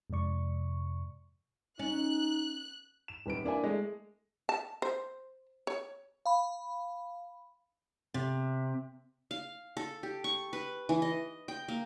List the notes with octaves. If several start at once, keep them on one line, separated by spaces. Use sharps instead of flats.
F2 G#2 C3 D5 C#6
C#4 D#4 F#6
E7
D#1 B4 D7
A#3 D4 E4 G#5
G#3 A3
A5
C5
C#5
F5 B5
C3
F5
A4
G4
C#6
B4
E3
D#5
G5
A#3